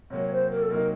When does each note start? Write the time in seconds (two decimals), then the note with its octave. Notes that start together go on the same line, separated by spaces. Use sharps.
0.10 C3 F#3 A#3 C#5
0.31 C5
0.51 A#4
0.62 A4
0.70 C3 F#3 A#3 D#4 A#4